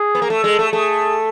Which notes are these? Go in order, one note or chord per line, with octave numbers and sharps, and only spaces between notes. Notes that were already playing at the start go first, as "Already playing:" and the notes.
Already playing: G#4
B3
A#3
A3 A4
G#3
A3
A3 G#4